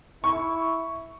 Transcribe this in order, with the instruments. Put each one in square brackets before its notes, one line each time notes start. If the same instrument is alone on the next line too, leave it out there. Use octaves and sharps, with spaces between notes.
[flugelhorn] E4 [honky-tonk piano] C#6